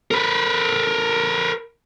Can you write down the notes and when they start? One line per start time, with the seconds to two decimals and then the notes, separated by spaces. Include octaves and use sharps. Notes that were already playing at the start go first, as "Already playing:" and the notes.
0.11 A#4 B4